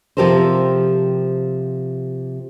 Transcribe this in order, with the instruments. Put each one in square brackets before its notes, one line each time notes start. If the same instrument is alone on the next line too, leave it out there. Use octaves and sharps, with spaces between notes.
[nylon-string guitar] C3 F3 G4 A4 A#4 C5